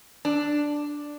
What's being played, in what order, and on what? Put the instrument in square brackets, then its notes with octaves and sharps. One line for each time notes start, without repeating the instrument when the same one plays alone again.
[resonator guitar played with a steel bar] D4